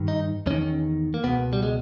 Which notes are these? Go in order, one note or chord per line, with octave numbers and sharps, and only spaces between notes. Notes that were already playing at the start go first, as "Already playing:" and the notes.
Already playing: G2 D#3
D#4
E2 D#3 C#4
A#3
C#2 B2 B3
G3
G#3